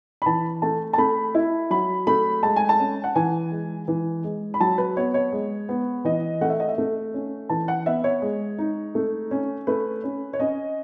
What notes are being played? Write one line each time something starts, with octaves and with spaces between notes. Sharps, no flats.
B5
E3 A5
A3 A5
A5
A3 B5
E4
F#3 B5
A3 B5
G#3 A5
G#5
A5
C#4
F#5
E3 G#5
G#3
E3
G#3
B5
F#3 A5
B4
B3 C#5
C#5
G#3
B3
E3 D#5
A3 F#5
E5
D#5
E5
A3
C#4
E3 A5
F#5
B3 E5
C#5
G#3
D#4
A3
C#4
A3 B4
C#4
C#5
C#4 D#5